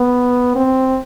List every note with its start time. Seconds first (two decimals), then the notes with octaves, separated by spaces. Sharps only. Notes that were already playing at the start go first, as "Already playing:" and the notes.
Already playing: B3
0.55 C4